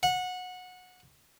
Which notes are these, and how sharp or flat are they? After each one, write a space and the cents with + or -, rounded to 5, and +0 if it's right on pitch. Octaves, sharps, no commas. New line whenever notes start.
F#5 -20